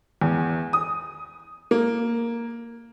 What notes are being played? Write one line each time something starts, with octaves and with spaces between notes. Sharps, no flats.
E2
D#6
A#3